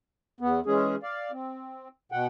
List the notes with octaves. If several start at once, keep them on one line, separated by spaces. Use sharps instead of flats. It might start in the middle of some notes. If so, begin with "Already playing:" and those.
E2 B3
E3 G#3 C#4 G#4
D5 F5
C4
B2 F#5 G5